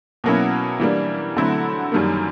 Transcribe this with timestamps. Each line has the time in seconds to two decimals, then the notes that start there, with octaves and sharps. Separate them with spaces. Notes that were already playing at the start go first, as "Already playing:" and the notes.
0.24 B2 F#3 A#3 C#4 E4
0.80 E3 G3 A#3 D4
1.37 D3 F#3 A3 C4 E4
1.92 F#2 D#3 G3 A#3